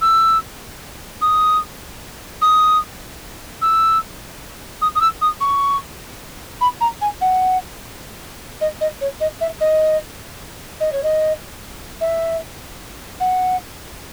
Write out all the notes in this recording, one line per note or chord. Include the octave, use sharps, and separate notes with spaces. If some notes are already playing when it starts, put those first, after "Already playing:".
E6
D#6
D#6
E6
D#6
D#6
E6
D#6
C#6
B5
A#5
G#5
F#5
D#5
D#5
C#5
D#5
E5
D#5
D#5
C#5
D#5
E5
F#5